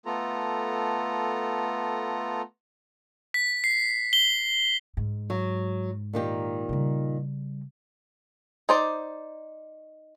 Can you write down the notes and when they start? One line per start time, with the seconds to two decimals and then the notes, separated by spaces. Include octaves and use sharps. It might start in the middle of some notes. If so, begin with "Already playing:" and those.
0.06 A3 B3 F4 A4 A#5
3.34 B6
3.64 C7
4.13 G7
4.97 G#2
5.30 F#3
6.13 A#2 D#3 G4
6.69 C#3 G3
8.69 D#4 C5 D5